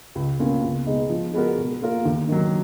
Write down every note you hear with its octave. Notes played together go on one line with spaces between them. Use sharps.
C#2
B2 A#3 C#4 F4
C#2
B2 G#3 D#4
F3
G#3 B3 F#4 A#4
B2
A#3 F4 A#4
D#2
D#3 F#3